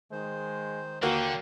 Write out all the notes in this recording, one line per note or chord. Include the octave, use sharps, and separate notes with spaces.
D#3 G#3 C5
D#2 D3 A#3 F#4 G5